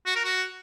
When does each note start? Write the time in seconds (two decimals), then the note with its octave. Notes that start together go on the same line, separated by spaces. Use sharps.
0.06 F#4
0.15 A#4
0.24 F#4